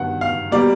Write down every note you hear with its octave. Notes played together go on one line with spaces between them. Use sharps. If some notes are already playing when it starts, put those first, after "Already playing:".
Already playing: G2 D#3 F#3 B3 F#5
F5
B2 G3 A#3 D5